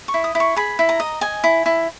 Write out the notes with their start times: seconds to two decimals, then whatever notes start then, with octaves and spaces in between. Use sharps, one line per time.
0.08 C#6
0.14 E4
0.24 D#6
0.35 E4
0.40 C#6
0.56 G#4 B5
0.79 E4
0.89 A#5
1.00 D#5
1.21 D#5 G#5
1.44 E4
1.66 E4